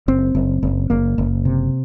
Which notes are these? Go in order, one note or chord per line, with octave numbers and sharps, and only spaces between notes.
F#1 C4
F#1
F#1
F#1 A#3
F#1
C3